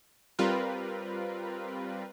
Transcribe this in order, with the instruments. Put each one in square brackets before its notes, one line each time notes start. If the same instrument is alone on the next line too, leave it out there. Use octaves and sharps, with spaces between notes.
[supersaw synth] G3 C4 F4 A#4 B4